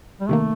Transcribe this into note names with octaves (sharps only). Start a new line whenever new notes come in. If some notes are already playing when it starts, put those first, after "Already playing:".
G3
C3 D#3 A3 A#3